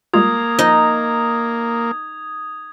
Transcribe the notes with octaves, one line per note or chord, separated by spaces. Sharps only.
G3 G#3 A#3 F4 D#6 G#6
F3 D#4